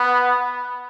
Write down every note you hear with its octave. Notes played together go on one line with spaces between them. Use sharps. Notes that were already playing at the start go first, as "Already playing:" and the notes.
Already playing: B3